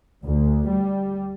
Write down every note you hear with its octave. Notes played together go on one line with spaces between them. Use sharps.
D2
G3